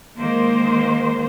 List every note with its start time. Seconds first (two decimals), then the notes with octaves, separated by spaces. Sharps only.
0.17 D#3 G#3 A#3 C5